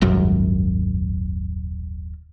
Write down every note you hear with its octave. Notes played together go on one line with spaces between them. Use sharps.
D#1 G#1 F#2